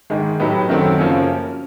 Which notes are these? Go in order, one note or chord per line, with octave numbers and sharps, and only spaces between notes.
G#2 D#3 G#3
A2 F#3 B3 D#4 G4
F#2 D#3 F#3 A3 C4
F#2 C#3 F3 A#3 C#4